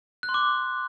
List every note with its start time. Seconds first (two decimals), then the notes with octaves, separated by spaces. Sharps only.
0.23 F#6
0.29 C6
0.34 D6